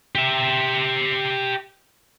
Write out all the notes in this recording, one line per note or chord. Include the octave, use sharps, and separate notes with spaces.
G4 E5